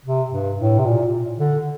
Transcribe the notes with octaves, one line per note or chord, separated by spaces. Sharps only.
C3
G2
A2
C3
A#2
D3